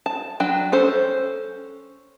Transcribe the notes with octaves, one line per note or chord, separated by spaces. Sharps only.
A5
F#3 D4 G5
C#4 A4 C5